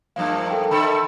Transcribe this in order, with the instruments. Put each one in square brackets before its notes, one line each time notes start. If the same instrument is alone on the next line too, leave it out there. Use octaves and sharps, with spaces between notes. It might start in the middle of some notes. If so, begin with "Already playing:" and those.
[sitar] G2 F3 A#3 [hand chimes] F5
[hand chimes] A4 G5
[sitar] D3 A4 E5 [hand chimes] B5